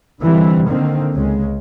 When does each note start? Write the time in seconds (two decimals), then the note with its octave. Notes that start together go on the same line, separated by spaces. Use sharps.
0.21 D3 E3 G3 C4
0.68 D3 D#3 A#3 C4
1.14 C#2 C#3 G#3